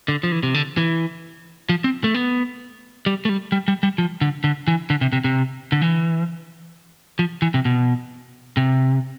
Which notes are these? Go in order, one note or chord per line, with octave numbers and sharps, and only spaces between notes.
D3
F3
E3
C3
D3
E3
F3
C4
A3
B3
G3
A3
G3
G3
G3
G3
F3
D3
D3
E3
D3
C3
C3
C3
D3
E3
F3
E3
C3
B2
C3